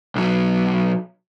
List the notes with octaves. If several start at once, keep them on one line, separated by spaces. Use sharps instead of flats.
B1 F#3